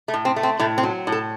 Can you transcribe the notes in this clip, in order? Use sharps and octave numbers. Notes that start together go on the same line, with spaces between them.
A3
A2
C4
A3
C4
A2 A3
C4
F#3
A2
A4